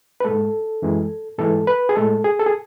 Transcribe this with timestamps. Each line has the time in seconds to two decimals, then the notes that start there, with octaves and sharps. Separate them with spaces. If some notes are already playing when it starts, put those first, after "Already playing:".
0.20 B4
0.24 G#2 G#3 A4
0.82 F#2 E3 G#3
1.39 G#2 E3 G#3 A4
1.67 B4
1.89 G#4
1.96 A2 G#3 A4
2.24 G#4
2.40 A4
2.46 G#4